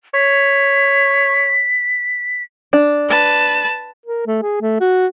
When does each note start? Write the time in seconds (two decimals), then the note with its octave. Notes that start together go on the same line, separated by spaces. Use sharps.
0.14 C#5 B6
2.73 D4
3.09 B4 A5
4.06 A#4
4.26 A3
4.43 G#4
4.61 A3
4.81 F#4